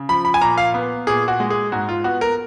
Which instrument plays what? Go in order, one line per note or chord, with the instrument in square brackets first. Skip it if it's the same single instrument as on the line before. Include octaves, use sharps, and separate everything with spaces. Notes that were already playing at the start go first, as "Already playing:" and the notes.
Already playing: [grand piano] C#3
F3 B5
B5
G#5
A#2 A#5
F5
B3
A#2 G#4
F#4
G#3
G#4
G#2 F#4
F4
B3 F#4
A#4